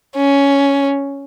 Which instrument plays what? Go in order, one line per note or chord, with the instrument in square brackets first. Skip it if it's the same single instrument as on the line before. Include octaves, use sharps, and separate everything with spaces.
[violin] C#4